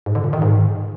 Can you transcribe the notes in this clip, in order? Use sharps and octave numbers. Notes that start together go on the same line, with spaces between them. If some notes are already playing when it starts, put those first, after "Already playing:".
G#2
D3
A#2
D#3
G#2